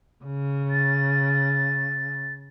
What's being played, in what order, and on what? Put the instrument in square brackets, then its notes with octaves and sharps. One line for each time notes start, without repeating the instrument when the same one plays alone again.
[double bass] C#3
[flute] A6